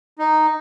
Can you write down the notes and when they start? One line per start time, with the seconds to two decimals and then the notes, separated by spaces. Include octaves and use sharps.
0.19 D#4